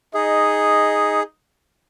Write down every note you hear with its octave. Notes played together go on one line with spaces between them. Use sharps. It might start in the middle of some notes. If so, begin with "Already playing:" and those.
D#4 G#4 D#5